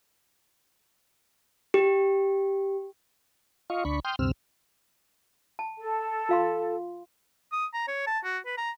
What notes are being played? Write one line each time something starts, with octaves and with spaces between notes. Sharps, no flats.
G4
F4 D#5 F5 C#6
D2 D4 B5 C#6
G5 C6 D#6 F6 G6
D2 G2 C3 C4 E6 F6
A5
A4
F4 F5 C6
D#6
A#5
C#5
A5
F#4
B4
A#5